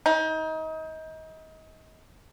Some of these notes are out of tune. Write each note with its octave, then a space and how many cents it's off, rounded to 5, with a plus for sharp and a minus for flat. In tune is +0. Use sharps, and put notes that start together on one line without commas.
D#4 +30